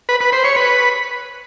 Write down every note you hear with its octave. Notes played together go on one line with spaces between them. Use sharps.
B4
B4
C5
C#5
B4